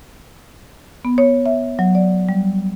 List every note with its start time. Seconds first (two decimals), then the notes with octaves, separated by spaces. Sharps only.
1.05 B3
1.18 C#5
1.46 E5
1.79 F#3
1.95 D5
2.29 G3